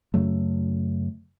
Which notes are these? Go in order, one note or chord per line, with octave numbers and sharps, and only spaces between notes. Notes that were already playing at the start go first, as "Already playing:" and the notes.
F#2 C#3 F#3 A3